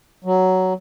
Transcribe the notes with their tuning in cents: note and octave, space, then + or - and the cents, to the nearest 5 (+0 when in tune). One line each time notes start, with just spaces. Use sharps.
F#3 +10